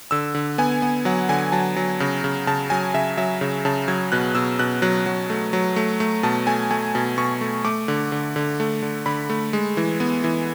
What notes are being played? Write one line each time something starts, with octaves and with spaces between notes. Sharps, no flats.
D3 E6
D3
B3 G#5
B3
F#3 F#5
D3 G#5
F#3 A5
F#3
C#3
C#3
C#3 A5
F#3 G#5
C#3 E5
F#3 E5
C#3
C#3 A5
F#3 G#6
B2 F#6
B2 E6
B2 F#6
F#3 F#6
F#3
A3
F#3
A3
A3
B2 A5
A3 G#5
A3 G#5
B2 A5
B2 C#6
A3
A3 D6
D3
D3
D3
A3
D3
D3 B5
A3
G#3
E3
B3
E3